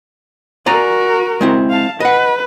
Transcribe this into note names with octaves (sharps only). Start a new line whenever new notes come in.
F#4 A#4 D5 G#5 A#5
G#3 C4 E4
F5 A5
B4 D#5 F#5